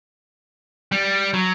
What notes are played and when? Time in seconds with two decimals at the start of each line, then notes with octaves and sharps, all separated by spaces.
0.92 G3
1.34 F#3